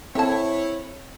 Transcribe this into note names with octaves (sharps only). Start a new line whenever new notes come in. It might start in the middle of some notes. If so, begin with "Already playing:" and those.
C4 E4 A4 C#5 E5 A5